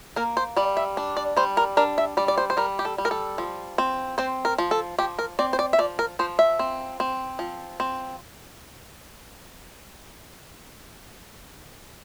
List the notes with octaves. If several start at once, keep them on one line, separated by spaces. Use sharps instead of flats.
A#3 A#4
C5
G3 D5
E5
D4
D5
G3 C5
A#4
D4 A#4
E5
G3 D5
D5
C5
C5
G3 A#4
G4
A4
G3
A#4
A4
F3
C4
C4 C5
A#4
F3
A4
F3 G4
A#4
C4 D5
C5
D5
E5
F3 D5
A#4
F3 C5
E5
C4
C4
F3
C4